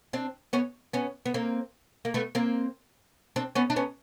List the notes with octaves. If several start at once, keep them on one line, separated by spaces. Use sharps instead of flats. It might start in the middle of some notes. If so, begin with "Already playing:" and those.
C4 D4
B3 C#4
B3 C#4
B3
A#3 C4
A#3
A3 B3
A#3 C4
C4 D4
B3 C#4
D4
B3 C#4